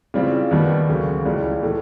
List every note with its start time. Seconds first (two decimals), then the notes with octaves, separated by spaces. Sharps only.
0.14 C#3 E3 G3 C4 F4
0.51 D#2 D#3 G3 B3
0.88 D2 C#3 F#3 A#3
1.25 C#2 C#3 E3 G3
1.62 A2 E3 A3